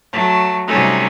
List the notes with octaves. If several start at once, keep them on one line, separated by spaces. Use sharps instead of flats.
F#3 A3
C3 F#3 G3 A3 C#4 D#4